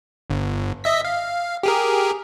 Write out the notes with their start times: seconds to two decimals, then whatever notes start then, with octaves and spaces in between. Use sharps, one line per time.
0.30 G1
0.84 D#5 E5 B6
1.05 F5
1.63 G4 G#4 A#4